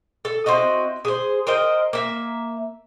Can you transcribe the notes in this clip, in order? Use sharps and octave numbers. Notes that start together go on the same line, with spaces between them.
A4
C4 E4 F#4 D#5
G#4 C5
A#4 C5 D#5 G5
A#3 E5